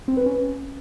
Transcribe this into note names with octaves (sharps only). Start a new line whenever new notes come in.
C4
B4
C#4